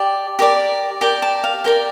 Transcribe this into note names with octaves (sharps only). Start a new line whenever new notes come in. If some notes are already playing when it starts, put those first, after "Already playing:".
Already playing: G4 D5 A5
G4 A#4 D5
G4 A#4 D5 G5
A5
F5
G4 A#4 D5 G5